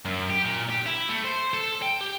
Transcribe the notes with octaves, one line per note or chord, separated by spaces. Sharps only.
F#2
G4
A#2
G4
E4
A3
C5
A4
G5
G4